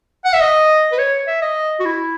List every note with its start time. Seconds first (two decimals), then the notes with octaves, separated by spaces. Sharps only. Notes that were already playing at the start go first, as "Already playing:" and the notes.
0.25 F#5
0.33 E5
0.41 D#5
0.92 B4
0.98 C#5
1.27 E5
1.42 D#5
1.80 F#4
1.85 E4